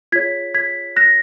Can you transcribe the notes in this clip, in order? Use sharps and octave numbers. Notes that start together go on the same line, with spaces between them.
F4 G#4 C#5 G#6 B6
G#6 B6
F#6 A#6